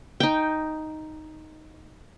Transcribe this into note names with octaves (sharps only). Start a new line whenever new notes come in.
D#4 G5